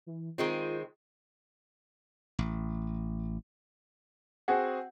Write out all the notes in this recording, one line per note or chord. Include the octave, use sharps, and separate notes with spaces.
E3
D#3 G#3 C4 F4
A1
C4 F#4 G#4 F#5